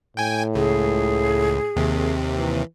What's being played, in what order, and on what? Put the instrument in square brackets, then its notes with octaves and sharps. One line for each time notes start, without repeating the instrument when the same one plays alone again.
[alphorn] A2 [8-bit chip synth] G5 G#5
[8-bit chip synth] C#2 [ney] G#4
[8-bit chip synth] D#2 C3
[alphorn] E3